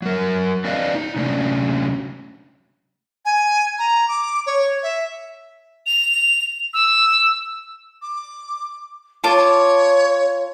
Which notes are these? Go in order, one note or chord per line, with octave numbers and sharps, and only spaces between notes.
F#3 A#4
C4 D4 B4 D5 D#5 F5
D#4
C3 F#3 A3 C#4 D4
G#5
A#5
D6
C#5
E5
F7
E6
D6
F4 C#5 A5 D6